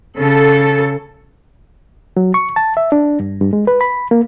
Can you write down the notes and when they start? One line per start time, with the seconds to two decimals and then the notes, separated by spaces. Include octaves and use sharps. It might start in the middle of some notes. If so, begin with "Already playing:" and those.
0.17 C#3 A4
2.17 F#3
2.34 C#6
2.56 A5
2.77 E5
2.92 D4
3.20 G2
3.41 G2
3.53 G#3
3.67 B4
3.81 B5
4.11 A#3